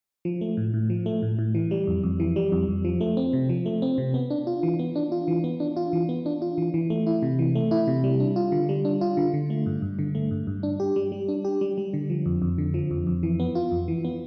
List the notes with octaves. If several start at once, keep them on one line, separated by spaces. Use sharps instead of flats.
F3
A3
A2
A2
F3
A3
A2
A2
E3
G3
F2
F2
E3
G3
F2
F2
F3
A3
C4
C3
F3
A3
C4
C3
B3
D4
F4
E3
B3
D4
F4
E3
B3
D4
F4
E3
B3
D4
F4
E3
E3
A3
E4
C3
E3
A3
E4
C3
G3
D4
F4
D3
G3
D4
F4
D3
D3
A3
G2
G2
D3
A3
G2
G2
D4
G4
G3
G3
D4
G4
G3
G3
D3
F3
F2
F2
D3
F3
F2
F2
E3
B3
F4
F2
E3
B3